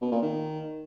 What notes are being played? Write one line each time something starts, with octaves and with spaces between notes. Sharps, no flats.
B2
A#2
D#3